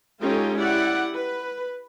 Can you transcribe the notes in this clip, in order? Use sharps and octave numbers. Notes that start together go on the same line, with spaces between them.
G#3 C#4 D#4 F4 G4 A4
E4 G4 D5 F#5
B4